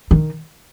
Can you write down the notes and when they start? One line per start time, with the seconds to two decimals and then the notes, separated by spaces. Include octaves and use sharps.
0.11 D#3